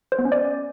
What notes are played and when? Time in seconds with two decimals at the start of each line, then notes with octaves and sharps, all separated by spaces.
0.12 C5
0.19 B3
0.25 C#4
0.32 D5